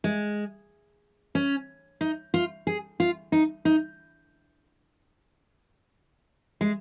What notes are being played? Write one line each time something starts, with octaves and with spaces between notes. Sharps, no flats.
G#3
C#4
D#4
F4
G#4
F4
D#4
D#4
G#3